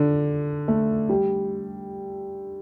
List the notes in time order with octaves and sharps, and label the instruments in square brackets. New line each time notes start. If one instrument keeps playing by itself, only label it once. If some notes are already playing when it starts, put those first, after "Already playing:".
Already playing: [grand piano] D3
A3
G3